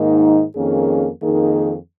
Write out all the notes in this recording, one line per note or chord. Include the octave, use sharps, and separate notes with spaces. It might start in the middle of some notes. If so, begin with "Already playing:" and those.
Already playing: G#2 D#3 A#3 D#4
F2 D#3 A#3 C#4 G#4
F2 D#3 A#3 D#4 G#4